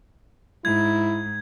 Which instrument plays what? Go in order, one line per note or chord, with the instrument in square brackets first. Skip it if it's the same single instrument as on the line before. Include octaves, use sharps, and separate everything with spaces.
[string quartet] G#2 [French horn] E4 [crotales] G#6